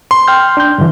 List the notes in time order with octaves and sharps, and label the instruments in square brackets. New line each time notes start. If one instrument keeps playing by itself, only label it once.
[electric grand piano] C6
[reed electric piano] G5 F6 G6
D4 G6
G2 D3 E3